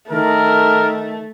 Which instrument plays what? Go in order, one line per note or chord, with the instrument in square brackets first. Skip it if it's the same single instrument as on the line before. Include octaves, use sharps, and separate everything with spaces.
[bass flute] D#3 [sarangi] A3 [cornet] A#4